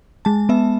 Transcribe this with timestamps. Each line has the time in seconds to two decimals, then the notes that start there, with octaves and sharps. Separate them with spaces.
0.25 G#3 A5
0.49 B3 E5